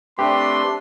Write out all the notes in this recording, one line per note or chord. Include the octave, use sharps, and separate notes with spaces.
A3 C4 D4 G4 B4 C6